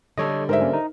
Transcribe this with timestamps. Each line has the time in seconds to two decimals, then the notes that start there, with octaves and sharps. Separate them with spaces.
0.18 D3 G3 D4 A4 C#5 D#5
0.49 G#2 A#4 C5 E5
0.61 A#3 C#4
0.73 D#4